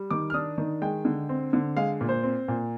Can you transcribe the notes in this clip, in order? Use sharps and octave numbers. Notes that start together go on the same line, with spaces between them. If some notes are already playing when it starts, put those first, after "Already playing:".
Already playing: G3
D#3 D6
F6
D4 D#6
D#3
G#3 G5
D3
C4
D3
G#3 F5
A#2
C5
C4
A#2